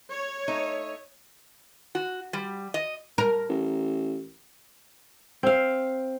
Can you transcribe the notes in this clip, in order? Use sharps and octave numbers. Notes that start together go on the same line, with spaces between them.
C#5
A3 D#4
F#4
G3
D#5
A#4
A1
C4 F5